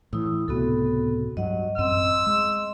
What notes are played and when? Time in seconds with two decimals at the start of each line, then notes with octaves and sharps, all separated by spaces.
0.13 A2 E3 E4 D#6 E6
0.48 C#2 A2 C3 B3 F#4 A4
1.37 G2 F#3 D#5 F#5
1.78 A1 F#2 C4 D#5 C6 E6
2.26 G#3 D#5 C6